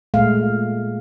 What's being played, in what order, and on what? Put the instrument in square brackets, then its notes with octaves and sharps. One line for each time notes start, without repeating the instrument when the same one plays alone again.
[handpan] A#2 G#3 A3 F5